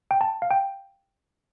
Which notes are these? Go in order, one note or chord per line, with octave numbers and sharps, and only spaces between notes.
G5
A5
F5
G5